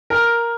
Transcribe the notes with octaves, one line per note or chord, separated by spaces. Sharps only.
A#4